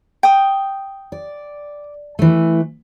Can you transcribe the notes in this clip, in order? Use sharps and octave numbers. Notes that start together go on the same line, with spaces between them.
G5 D#6
D5
E3 A3